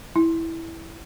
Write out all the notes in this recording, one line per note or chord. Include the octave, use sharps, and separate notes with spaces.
E4